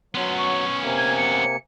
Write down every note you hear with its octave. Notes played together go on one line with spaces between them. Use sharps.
F#3 B3 C#4 C6
C#6
C3 A#3 G#5
G#6
C#7